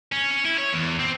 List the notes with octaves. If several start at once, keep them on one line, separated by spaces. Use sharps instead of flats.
C#4
C#4
E4
C#5
E2
C4